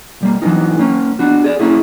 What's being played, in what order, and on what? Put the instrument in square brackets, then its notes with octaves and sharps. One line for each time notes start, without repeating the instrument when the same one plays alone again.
[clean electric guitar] B1 G3 A#3
E3 F#3 G#3 B3 C#4 D#4
A#3 C#4
B3 D4 F#4
G#4 D5
A#3 C#4 E4 G#4